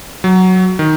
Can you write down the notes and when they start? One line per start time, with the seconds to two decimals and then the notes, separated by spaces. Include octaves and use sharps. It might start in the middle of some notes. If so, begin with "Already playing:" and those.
0.24 F#3
0.79 D#3